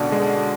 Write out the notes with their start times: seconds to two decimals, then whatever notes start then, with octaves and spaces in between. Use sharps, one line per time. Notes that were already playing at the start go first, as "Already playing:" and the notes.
Already playing: C#2 B2 D3 C#4 D4
0.12 G#3